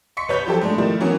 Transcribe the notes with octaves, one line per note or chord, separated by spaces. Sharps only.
C6 C#6 B6 C#7
C2 B4 C#5 G6
F3 F#3 G4 A4 C5
G#2 A3 D4
D#3 F3 G3 A3 E4
E3 F#3 A#3 B3 C#4